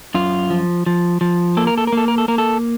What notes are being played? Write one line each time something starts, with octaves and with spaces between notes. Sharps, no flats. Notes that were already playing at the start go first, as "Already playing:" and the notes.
F#2 F4
F3
F3
F3
A#3 A4
A#4
A4
A#4
A#3 A4
A#4
A4
A#3 A#4
A4